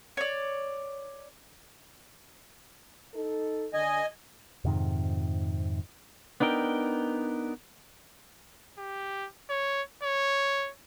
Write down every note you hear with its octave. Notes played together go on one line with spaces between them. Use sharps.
C#5 D5
D#4 A4
D3 D#5 G#5
F2 G#2 C3 D#3
B3 D4 D#4 A#4 G5
G4
C#5
C#5